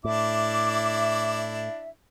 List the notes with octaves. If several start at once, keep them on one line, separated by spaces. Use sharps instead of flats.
A2 D4 E4 E5 D6